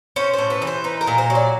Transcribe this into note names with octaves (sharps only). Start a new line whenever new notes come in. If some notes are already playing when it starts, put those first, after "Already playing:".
C#4 C5
A2 C5
B4
E3
C5
D#4 B4
A#4
A#2
C5
F#3
D5